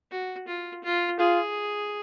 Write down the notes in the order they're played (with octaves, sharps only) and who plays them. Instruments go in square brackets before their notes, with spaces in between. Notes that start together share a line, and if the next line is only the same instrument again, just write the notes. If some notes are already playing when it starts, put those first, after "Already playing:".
[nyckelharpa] F#4
F4
F4
[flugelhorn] F4 [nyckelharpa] G#4